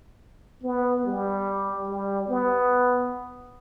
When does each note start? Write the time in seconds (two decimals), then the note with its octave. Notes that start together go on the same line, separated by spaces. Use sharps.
0.63 B3
1.05 G3
1.87 G3
2.29 B3